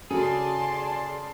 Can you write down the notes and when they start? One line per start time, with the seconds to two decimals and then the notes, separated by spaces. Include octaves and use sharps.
0.11 C#3 F#4 G#4 A4 D5 A5 C6